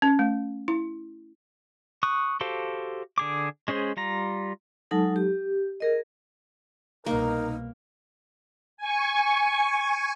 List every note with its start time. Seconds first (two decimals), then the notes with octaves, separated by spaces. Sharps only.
0.02 C#4
0.19 A3
0.68 E4
2.03 C#6 D#6 F#6
2.41 F#4 G4 A4 C5 F5
3.18 D3 G#4 D6
3.68 G#3 C#4 G#4 C5
3.97 G3 F4 A#5
4.91 F#3 G#3 D#4 A4 A5
5.16 G4
5.80 G#4 A#4 D#5
7.06 C2 B2 A#3 D#4 A#4
8.77 G#5 C#6